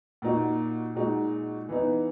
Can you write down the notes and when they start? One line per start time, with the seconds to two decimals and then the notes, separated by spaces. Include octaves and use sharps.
0.22 A#2 A#3 D#4 F#4
0.95 A#2 G#3 D#4 F#4
1.69 E3 B3 D#4